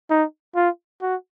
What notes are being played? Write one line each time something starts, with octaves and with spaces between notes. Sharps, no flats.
D#4
F4
F#4